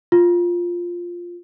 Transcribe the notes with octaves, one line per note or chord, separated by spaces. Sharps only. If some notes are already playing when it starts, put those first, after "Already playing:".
F4